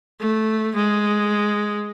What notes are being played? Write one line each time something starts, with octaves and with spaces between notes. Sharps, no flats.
A3
G#3